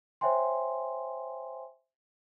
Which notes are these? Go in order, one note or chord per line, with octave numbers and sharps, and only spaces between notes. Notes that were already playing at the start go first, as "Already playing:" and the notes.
C5 C#5 E5 G5 G#5 C6